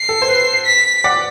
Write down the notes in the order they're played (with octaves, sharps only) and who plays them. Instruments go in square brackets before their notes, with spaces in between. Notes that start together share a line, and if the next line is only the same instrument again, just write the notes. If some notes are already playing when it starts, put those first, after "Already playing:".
Already playing: [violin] C7
[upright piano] A4
C5
B4
[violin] B6
[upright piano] D5 F#5